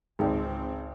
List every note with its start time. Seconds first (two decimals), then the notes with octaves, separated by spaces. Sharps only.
0.19 G#1 C#2 C4 D#4 G#4 G5